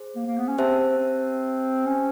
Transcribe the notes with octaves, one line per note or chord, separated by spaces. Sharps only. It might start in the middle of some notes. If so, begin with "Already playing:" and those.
Already playing: G#4 C5
A#3
A#3
B3
C#4
C4 G4 C5 E5 A5
C#4